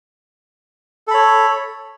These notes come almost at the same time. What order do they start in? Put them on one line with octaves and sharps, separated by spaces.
A4 B5 C#5